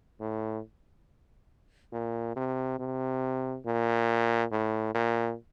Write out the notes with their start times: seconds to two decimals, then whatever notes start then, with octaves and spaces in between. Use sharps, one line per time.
0.21 A2
1.93 A#2
2.36 C3
2.79 C3
3.66 A#2
4.51 A2
4.94 A#2